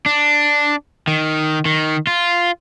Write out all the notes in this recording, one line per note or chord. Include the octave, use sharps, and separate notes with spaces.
D4
D#3
D#3
F4